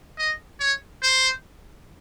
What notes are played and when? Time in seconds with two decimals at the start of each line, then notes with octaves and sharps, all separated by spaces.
0.18 D#5
0.60 C#5
1.03 C5